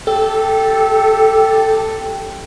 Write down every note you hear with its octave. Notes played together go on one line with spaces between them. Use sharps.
G4 A4